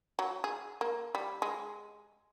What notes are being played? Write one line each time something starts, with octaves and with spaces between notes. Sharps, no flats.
F#3
G#4
A#3
G3
G#3